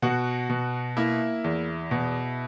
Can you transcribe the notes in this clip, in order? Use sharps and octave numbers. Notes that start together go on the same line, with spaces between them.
B2 F#4 F#5
B2
A#3 E4 E5
E2
B2